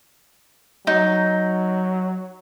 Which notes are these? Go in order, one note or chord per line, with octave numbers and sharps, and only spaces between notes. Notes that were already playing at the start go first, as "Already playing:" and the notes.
F#3 D#4